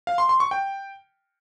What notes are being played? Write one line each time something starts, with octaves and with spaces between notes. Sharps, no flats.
F5
C6
C6
C#6
G5